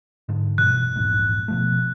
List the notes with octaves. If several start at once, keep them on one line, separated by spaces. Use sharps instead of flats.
G#2 D3
G2 B2 E3 F#6
A#1 E2 G#2
B2 F3 A3